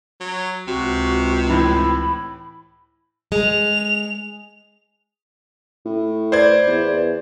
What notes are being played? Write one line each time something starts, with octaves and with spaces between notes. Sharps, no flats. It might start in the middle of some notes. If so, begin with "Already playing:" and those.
F#3
C#2 C3 F#4
A2 E3 B5
G#3 F7
A2
B4 C5 D5 G#6
E2